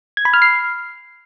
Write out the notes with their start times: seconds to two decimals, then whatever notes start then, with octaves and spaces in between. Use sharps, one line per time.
0.17 G#6
0.25 B5
0.34 F6
0.42 C7